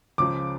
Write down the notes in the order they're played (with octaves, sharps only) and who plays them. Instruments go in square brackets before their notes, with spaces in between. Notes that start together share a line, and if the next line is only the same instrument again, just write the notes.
[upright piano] C#2 C#3 F3 [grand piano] D6